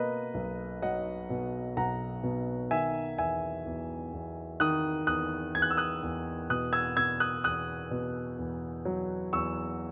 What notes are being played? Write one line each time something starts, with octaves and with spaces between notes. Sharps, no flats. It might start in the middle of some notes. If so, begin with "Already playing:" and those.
Already playing: B2 A#3 B4 D#5
B1
F#3 D#5 F#5
B2
B1 F#5 A#5
B2
D#3 E5 G#5
E2 E5 G#5
E2
E2
D#3 D#6 F#6
E2 D#6 F#6
E2 G#6
F#6
E6
D#6 F#6
E2
B2 D#6 F#6
E6 G#6
B2 E6 G#6
D#6 F#6
E2 D#6 F#6
B2
E2
F#3
E2 C#6 E6